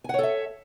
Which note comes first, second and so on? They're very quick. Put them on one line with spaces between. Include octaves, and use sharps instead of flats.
G#5 F#5 C#5 A4 E5